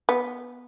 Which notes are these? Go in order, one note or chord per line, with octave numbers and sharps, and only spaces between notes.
B3